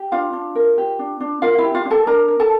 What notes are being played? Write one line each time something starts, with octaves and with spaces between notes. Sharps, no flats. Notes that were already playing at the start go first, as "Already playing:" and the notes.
Already playing: G4
D4 F4 F5
D4
A#4
G4
D4
D4
F4 A#4 F5
E4 E5
G4
F4 F5
D4
A4 A5
D4 A#4 A#5
A#4
A4 A5